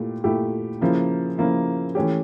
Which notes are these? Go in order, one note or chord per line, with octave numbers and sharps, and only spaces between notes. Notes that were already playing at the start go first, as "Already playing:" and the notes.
Already playing: A#2 A3 E4 G4
A#2 A3 E4 G4
C#3 F3 A#3 E4
C#3 F3 A#3 E4
E3 A3 C#4 G4